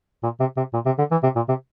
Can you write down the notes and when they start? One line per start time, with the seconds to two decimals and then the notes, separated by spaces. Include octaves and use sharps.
0.23 A#2
0.40 C3
0.57 C3
0.74 A#2
0.86 C3
0.98 D3
1.11 E3
1.23 C3
1.36 A#2
1.48 C3